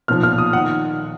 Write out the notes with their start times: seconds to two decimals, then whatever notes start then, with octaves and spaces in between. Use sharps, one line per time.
0.08 B1 A#2 F3 F6
0.23 F6
0.38 D#6
0.53 D#3 F#5